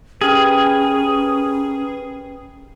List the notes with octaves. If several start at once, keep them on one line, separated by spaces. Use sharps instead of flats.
C#4 G4 G#4 A#4 B4 G5 F6